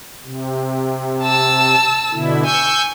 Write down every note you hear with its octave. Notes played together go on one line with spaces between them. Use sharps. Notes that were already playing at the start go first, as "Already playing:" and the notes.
C3
A5 E6
B2 D3 E4
G#5 C#6 E6 G6